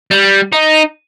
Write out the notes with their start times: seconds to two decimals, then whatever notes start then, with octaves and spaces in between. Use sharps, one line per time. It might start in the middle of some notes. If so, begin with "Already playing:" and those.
0.11 G3
0.53 D#4